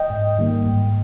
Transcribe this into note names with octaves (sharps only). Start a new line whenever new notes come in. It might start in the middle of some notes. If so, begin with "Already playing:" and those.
Already playing: D#5 G5
G#2
D#3 G3 A#3
G#2